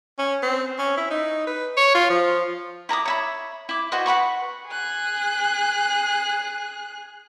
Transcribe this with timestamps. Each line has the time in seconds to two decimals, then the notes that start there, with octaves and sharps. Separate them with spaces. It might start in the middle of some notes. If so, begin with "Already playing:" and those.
0.19 C#4
0.43 C4
0.79 C#4
0.97 E4
1.10 D#4
1.47 B4
1.77 C#5
1.95 F4
2.10 F3
2.89 E4 A#5 D6 D#6
3.05 C#5 E5 B5
3.69 E4 D6
3.92 F#4 B4 C5 D#5
4.06 B4 F#5 B5 C#6
4.68 G#4 F#6